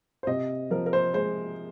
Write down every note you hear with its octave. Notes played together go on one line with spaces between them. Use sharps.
C5
C3 D#5
F3 A#4
A#4
C5
G#3 C5